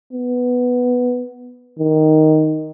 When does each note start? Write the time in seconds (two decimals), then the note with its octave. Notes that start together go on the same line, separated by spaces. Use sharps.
0.13 B3
1.79 D#3